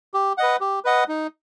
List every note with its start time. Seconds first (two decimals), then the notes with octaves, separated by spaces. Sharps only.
0.14 G4
0.38 B4 D#5 F#5
0.61 G4
0.85 B4 D#5 F#5
1.08 D#4